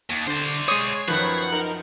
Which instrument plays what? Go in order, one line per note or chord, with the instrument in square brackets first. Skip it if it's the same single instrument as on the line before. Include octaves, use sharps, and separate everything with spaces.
[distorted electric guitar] D#2
[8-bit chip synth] D3 [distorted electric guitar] C5 D5
[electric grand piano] G#3 C#7 [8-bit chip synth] C#5 G#6 C7 [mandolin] D#6
[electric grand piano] F#2 D#3 F3 [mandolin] B4 [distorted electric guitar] F#5
[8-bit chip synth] D#4 A#4